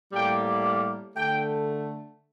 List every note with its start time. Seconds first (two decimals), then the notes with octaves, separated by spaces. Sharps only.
0.12 A2 G3 A#3 G5
1.16 D3 A3 G5